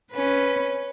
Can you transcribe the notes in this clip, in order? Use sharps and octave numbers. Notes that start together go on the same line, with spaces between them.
C#4 B4